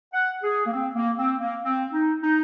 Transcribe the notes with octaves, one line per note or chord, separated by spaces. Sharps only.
F#5
G#4
A#3
C4
A#3
C4
A#3
C4
D#4
D#4